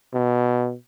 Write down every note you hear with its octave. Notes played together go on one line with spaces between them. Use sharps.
B2